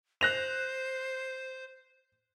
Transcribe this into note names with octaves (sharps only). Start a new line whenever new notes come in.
C5 F#6 A#6 F7